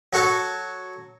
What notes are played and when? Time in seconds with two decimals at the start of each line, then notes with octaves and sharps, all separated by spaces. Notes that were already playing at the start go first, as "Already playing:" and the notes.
0.13 F#3 F#4 A4 C#5 A5